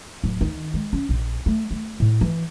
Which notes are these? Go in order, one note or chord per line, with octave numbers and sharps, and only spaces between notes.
D1
D#3
G#3
C#4
A#1
A3
A3
A2
E3